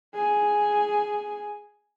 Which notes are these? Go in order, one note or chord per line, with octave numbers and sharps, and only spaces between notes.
G#4 G#5